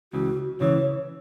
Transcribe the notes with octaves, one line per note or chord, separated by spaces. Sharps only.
C#2 C#3 E3 F#4
C#2 C#3 E3 C#5